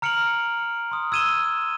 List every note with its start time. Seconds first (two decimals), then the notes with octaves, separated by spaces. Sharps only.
0.02 A#5 F6 C#7 D7 F7 F#7
0.91 C6 D#6
1.12 E6 G#6 D#7 E7 G7